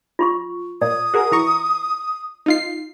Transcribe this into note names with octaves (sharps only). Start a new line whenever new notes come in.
F4 C6 C#6
A#2 D5 D#6
F#4 G#4 A#4
E3 A#5 C#6
D#4 F4 C7